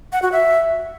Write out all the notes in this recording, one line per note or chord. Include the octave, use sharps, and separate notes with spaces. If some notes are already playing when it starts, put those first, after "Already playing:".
F#5
F#4
E5